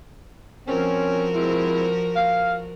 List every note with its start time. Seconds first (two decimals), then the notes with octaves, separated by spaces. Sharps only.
0.68 F3 C4 C#4 F#4 A#4
1.34 G#3 C4 E4
2.16 F5